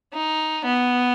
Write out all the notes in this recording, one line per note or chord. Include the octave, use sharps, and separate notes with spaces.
D#4
B3